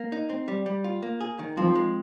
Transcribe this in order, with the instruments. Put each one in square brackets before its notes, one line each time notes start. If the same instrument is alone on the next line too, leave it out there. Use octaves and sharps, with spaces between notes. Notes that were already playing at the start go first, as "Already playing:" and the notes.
Already playing: [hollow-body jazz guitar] A#3
D#4
C4
G3
G3
F4
A#3
G#4
D#3
[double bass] F3 [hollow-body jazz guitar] C4
[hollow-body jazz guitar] G#3